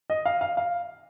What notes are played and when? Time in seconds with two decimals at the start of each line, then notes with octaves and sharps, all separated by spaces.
0.10 D#5
0.26 F5
0.41 F5
0.57 F5